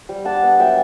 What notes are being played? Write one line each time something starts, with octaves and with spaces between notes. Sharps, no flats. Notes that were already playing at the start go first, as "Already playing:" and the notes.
G3
D4 F#5 A5
B3
F#3 E5 G5